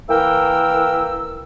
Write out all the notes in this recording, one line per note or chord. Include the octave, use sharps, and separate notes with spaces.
E3 A#3 A#4 B4 G5 E6